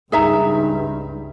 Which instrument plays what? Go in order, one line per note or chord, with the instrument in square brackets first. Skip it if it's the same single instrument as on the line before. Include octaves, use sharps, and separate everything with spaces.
[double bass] C#2 G2 [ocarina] D#4 [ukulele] G#4 E5 A#5